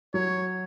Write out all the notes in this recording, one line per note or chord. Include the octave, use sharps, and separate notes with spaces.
F#3 C#5